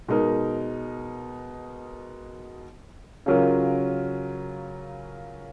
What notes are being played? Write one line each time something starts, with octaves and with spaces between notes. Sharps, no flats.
B2 G#3 D#4 A#4
C#3 F#3 C#4 F4 A#4